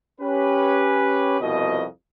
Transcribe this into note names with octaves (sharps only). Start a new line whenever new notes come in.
C#4 G4 B4
C2 F2 B2 D#5